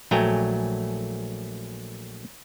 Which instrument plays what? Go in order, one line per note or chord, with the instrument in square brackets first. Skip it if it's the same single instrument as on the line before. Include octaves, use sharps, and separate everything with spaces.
[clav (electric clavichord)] A#1 F#3 A3 G5 G#5 A#5